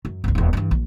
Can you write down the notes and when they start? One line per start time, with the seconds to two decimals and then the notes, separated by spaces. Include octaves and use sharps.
0.05 F#2
0.24 G1 D2
0.35 D#1 E2
0.53 G2 E3
0.71 A#1